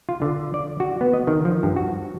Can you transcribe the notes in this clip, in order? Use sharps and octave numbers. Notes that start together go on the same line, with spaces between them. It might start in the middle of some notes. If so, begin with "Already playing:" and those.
F4
D3
D5
F#4
B3
D#5
D#3
F3
G2
F#4